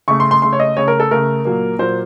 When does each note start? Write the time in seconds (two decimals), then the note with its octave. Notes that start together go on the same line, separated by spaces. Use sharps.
0.08 C#3 A3 C#6
0.20 C6
0.31 C6
0.42 C#3 A3 C6
0.53 C#5
0.60 D#5
0.77 C#3 A3 C#5
0.88 A#4
1.00 A4
1.11 C#3 A3 A#4
1.45 A#2 F#3 A#3
1.79 A#2 F#3 A#3 C5